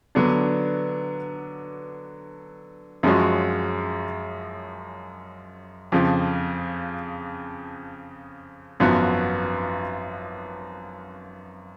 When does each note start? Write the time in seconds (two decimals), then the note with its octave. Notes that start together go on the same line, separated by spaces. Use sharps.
0.15 D3 F#3 B3 D4
3.03 F#2 F3 G#3 C#4 F#4
5.92 F2 C#3 F3
8.80 G#1 F#2 F3 B3 F#4